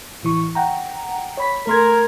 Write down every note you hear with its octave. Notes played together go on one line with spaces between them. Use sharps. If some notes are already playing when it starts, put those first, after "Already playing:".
A1 E3 C#6
F#5 G5 A#5
C#5 B5 B6
A3 A#4 C6 G#6